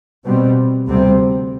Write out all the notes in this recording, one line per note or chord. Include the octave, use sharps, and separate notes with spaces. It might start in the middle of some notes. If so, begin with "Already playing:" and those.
B2 G3 C4
D2 C3 G3 C4